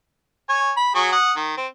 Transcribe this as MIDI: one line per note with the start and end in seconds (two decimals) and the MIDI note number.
0.49 0.72 73
0.49 0.72 80
0.77 0.92 83
0.95 1.12 54
0.95 1.12 66
0.95 1.12 68
1.13 1.33 78
1.13 1.33 87
1.36 1.56 51
1.57 1.66 60